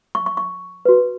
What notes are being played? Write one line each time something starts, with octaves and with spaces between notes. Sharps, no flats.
C#6
C#6
C#6
F#4 B4